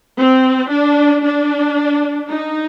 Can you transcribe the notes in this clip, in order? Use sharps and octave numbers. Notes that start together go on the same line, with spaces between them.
C4
D4
D4
D#4